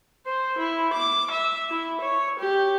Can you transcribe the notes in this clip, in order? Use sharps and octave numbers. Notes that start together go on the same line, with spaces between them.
C5
E4
D6
E5
E4
C#5
G4